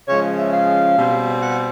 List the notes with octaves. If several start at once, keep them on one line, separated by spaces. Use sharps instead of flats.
C#3 F3 G#3 C#5
E5
F5
B2 G3 C4
F#5